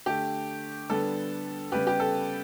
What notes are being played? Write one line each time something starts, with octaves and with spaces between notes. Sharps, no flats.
D3 A3 G4
D3 G3 B3 A4
C#3 G3 B3 G4 B4
G4
A4